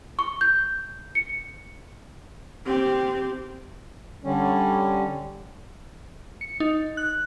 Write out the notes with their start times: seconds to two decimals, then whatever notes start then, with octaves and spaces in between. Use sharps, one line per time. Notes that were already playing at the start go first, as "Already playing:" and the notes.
0.19 C#6
0.41 G6
1.15 C#7
2.66 C4 G4
4.24 D3 G3 C#4
6.41 C#7
6.60 D#4
6.97 F#6